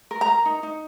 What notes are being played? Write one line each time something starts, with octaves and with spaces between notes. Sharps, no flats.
A#4
A#5
A#4
D#4
D#4